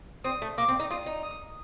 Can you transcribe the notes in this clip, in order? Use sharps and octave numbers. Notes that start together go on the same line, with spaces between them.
C4 D#6
A3
A#3 D6
C4
D#4
F4 D#6
D#4
D#6